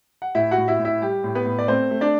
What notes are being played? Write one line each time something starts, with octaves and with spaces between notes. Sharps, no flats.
F#5
A2 E4 E5
F#4 F#5
A2
E4 E5
A2
E4 E5
G3 G4
A2
B3 B4
A2
D5
A3 C4 C5
A3
D4 D5